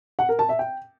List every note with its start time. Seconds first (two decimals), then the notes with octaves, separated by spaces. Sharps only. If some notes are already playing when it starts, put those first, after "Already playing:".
0.19 F#5
0.29 A#4
0.39 A5
0.49 E5
0.59 G5